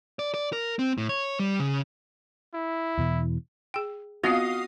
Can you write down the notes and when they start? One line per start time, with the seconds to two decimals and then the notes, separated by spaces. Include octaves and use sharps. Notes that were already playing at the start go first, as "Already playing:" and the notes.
0.19 D5
0.34 D5
0.53 A#4
0.79 C4
0.98 A2
1.09 C#5
1.39 G3
1.59 C#3
2.54 E4
2.98 E2 B2 E3
3.74 G#4 G5
4.24 B3 C4 F4 F#4 D#5 F5 D#6 C7